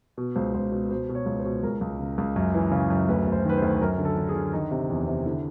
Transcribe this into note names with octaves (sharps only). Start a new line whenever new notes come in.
B2
C#2 C5
C#2 C5
B2
B2 C5
B2
C#5
C#2
C5
B2
C#2 A#4
C#2
C#3
C#2
F#2
E3
C#3
F#2
D2 B4
D2
C5
D#3 B4
C5
D2
F#2 A#4
D3
A4
D3
G#4
D3
D#3 D#4
C3
E2
C3
D3 E4